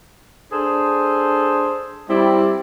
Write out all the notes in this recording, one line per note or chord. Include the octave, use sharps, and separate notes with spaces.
D4 G#4 A4 C5
G3 C4 E4 D5